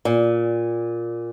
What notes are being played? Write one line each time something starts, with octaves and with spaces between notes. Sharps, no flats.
A#2